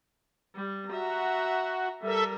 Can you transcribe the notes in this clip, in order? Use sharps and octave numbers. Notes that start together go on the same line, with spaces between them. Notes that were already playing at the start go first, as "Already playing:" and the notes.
G3
F#4 E5 A#5
G3 A4 A#4 E5